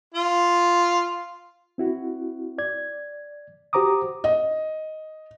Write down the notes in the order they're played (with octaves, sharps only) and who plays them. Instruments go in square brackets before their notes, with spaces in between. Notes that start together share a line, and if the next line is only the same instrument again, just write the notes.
[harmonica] F4
[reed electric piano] C4 E4 F#4
D5 G#6
F#4 G4 C5 A#5 D6 D#6
[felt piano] D#5